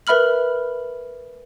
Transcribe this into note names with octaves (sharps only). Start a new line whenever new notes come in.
A#4 B4 E5 B5 F6 F#7